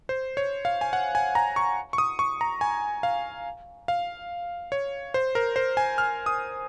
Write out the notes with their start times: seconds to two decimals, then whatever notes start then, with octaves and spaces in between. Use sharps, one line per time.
0.09 C5
0.37 C#5
0.65 F5
0.81 G#5
0.93 F#5
1.15 G#5
1.35 A#5
1.56 C#6
1.93 C#6
1.98 D#6
2.19 C#6
2.41 A#5
2.61 G#5
3.03 F5
3.88 F5
4.72 C#5
5.14 C5
5.35 A#4
5.56 C5
5.77 G#5
5.98 F6
6.26 D#6